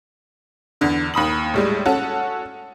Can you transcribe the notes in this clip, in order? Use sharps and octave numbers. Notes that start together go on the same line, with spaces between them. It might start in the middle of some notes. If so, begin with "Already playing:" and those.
E2 D3
D#2 B5 D#6 F#7
A2 G3 G#3
C#4 F#4 A4